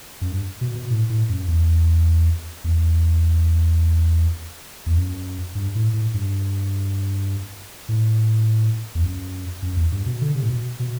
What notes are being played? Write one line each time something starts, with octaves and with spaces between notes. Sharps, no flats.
F#2
G2
B2
B2
A2
A2
F#2
E2
E2
E2
F#2
G2
A2
A2
G2
A2
E2
F#2
F#2
E2
G2
B2
D3
C3
A2
B2
B2